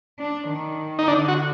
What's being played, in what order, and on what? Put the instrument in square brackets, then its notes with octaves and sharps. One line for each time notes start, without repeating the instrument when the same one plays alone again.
[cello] D4
D#3
[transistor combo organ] D#4
[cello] D3 [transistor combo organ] D4
[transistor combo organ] F#4